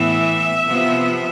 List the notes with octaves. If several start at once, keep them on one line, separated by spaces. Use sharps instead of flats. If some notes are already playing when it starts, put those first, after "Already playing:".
Already playing: A2 E3 B3 E5
C3 F3 B3